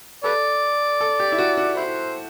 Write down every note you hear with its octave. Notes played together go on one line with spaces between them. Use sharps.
A4 B4 D5
A4
G4
E4
F#4
F#4
E4 C5